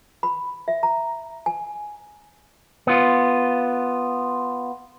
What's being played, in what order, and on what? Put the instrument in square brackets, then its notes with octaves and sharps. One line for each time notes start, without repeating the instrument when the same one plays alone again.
[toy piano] B5
E5
A#5
G#5
[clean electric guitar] B3 F4